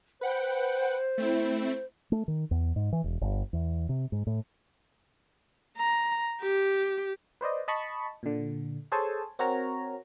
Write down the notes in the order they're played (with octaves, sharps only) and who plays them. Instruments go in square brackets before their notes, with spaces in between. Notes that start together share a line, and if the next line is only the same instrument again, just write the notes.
[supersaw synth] B4 F#5 G5 [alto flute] C5
[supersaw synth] A3 C4 E4
[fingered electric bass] A3
D#3
E2
G#2
E3
E1
G1
E2
C3
G#2
A2
[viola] A#5
G4
[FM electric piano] B4 C5 D5 D#5
D#5 A5 B5 C#6
A#2 D3
G#4 A4 C5 C#5 G#5 A5
C4 F#4 A#4 C#5 A#5